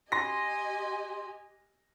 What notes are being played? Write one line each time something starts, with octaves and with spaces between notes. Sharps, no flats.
G4 D#5 G#5 C6 A#6